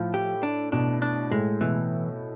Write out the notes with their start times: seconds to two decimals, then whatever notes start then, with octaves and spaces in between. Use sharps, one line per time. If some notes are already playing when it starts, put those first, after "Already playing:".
Already playing: A2 F3
0.14 G4
0.43 D4
0.72 B2 D4
1.02 D4
1.31 A2 G#3
1.61 B2 E3